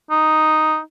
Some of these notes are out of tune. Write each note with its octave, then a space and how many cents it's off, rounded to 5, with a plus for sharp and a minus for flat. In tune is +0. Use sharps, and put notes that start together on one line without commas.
D#4 +0